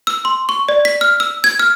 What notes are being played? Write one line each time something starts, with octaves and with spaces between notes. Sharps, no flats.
E6
C6
C#6
D5
B6
F6
E6
G#6
F6